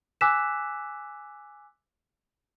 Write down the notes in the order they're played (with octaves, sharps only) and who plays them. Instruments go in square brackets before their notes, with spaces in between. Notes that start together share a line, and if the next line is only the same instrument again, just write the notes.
[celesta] G#5 D6 E6 F#6 B6 E7